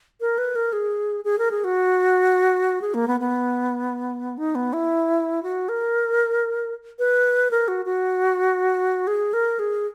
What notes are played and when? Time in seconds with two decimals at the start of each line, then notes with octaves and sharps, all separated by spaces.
0.21 A#4
0.38 B4
0.56 A#4
0.73 G#4
1.25 G#4
1.39 A#4
1.51 G#4
1.64 F#4
2.81 G#4
2.94 A#3
3.08 B3
3.20 B3
4.38 D#4
4.55 B3
4.73 E4
5.43 F#4
5.69 A#4
6.99 B4
7.51 A#4
7.68 F#4
7.85 F#4
9.07 G#4
9.33 A#4
9.59 G#4